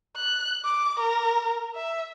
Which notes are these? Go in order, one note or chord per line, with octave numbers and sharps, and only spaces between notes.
F#6
D6
A#4
E5